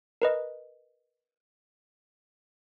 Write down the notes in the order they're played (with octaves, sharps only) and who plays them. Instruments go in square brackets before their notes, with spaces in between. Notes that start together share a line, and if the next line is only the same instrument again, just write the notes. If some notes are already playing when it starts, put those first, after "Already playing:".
[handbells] A#4 B4 D#5